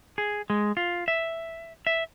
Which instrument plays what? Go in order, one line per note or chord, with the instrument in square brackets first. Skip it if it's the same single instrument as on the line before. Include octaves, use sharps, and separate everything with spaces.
[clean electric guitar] G#4
G#3
F4
E5
E5